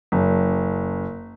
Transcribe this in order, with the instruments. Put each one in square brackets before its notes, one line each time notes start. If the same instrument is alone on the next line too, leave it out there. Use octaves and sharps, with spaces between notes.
[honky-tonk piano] F#1